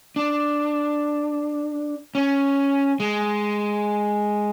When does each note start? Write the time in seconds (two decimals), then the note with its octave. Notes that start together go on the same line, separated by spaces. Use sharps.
0.16 D4
2.15 C#4
3.00 G#3